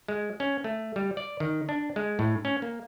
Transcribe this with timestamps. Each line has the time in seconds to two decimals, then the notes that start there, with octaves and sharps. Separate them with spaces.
0.08 G#3
0.40 C#4
0.64 A3
0.96 G3
1.17 D5
1.40 D#3
1.69 D4
1.96 G#3
2.19 A2
2.45 C#4
2.62 A#3